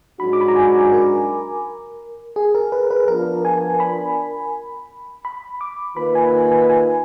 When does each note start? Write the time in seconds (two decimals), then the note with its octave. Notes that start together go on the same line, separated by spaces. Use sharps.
0.19 G#2 F#3 D4 F#4 B5
0.33 D6
0.41 B5
0.48 A#5
0.56 G#5
0.92 A#4
2.36 G#4
2.55 A#4
2.72 B4
2.91 B4
3.08 F3 B3 D4 F4 A#4
3.45 G#5
3.80 B5
5.25 B5
5.61 D6
5.97 D#3 A#3 F4 B4 B5
6.15 G#5
6.52 G#5
6.70 G#5